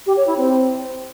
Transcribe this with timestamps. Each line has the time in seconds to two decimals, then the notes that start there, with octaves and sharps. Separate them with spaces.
0.06 G4
0.16 C#5
0.27 E4
0.37 C4